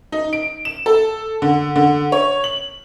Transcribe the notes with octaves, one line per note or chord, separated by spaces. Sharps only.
D#4
D7
E7
A4
D3
D3
C#5
F#7